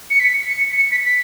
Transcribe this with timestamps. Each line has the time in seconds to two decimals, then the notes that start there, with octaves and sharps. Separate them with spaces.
0.10 C#7
0.20 B6
0.49 C#7
0.77 C#7
0.91 B6
1.06 B6